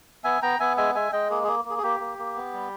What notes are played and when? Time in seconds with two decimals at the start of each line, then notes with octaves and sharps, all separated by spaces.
0.24 B3 E5 G#5
0.42 B3 G5 A#5
0.60 B3 E5 G#5
0.77 G#3 E5 G#5
0.95 G#3 E5 G#5
1.12 G#3 D#5 G5
1.30 A#3 G#4
1.43 A#3 G#4
1.65 A#3 G#4
1.77 G#4
1.83 A#3 G4
2.00 A#3
2.18 A#3
2.35 B3
2.53 G3